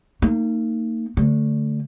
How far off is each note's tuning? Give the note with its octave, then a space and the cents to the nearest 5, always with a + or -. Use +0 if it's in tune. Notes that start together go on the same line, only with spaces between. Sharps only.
A#3 -40 D#4 +0
D3 -20 A3 +0